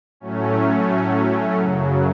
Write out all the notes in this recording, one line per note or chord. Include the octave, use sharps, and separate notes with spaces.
A2 F#3 A3 C#4
F#2 C#3 F#3